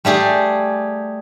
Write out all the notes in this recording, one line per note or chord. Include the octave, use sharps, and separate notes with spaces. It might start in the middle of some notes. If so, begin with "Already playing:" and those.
G3 A3 G4 G#4